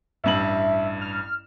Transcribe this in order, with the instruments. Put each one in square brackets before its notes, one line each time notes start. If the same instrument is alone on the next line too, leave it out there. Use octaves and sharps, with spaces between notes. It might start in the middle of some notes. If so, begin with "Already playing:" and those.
[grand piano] A1 G2 F#7 [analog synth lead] E5
[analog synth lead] F6